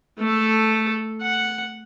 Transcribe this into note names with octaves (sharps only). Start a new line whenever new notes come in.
A3 A4
F#5